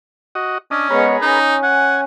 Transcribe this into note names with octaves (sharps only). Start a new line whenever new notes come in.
F#4 D#5
C#4 D4 D#5
G#3 B3 G#4 A#4 B4 C#5
C#4 D#4
F#5 G#5